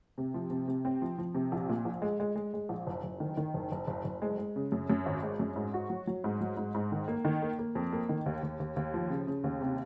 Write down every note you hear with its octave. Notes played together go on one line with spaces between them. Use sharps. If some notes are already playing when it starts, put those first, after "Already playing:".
C3
F3
C3
C3
C4
F3
F3
C3
A#1
A#2
A#1
G#3
G#3
G#3
G#3
A#1
F#1
F#1
D#3
D#3
F#1
F#1
F#1
F#1
G#3
G#3
C#3
F#2
F#2
G#1
G#3
F#2
G#2
F#4
F#3
F#3
G#2
F#3
G#2
G#2
D#3
A#3
D#3
A#3
A#3
F2
A#3
D#3
D#2
D#2
D#2
D#2
F3
C#3
C#3
D#2
C3